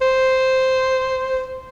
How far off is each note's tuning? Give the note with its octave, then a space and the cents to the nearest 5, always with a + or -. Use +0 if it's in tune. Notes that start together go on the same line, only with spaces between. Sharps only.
C5 -5